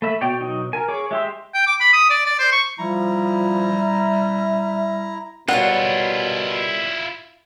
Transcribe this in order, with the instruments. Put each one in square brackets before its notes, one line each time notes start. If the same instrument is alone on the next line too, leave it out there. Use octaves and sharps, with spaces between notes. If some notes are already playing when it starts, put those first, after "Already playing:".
[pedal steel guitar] A3 E5 [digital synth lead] B5
[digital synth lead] B2 [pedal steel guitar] C#5 D5 G5
[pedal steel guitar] F#3 D#4
[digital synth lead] A#4 [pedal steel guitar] G#5
[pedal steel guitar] G#4 C#5 [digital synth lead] D6
[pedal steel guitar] G#3 G4 C6 [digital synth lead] E5
[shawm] G5
D6
B5
D#6
D5
D5
C5
C#6
[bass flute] F3 [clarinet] G3 [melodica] E4 A#5
[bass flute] E5
[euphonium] B2 [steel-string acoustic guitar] G3 A#4 C#5 [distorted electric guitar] E4 F4 [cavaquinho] F#5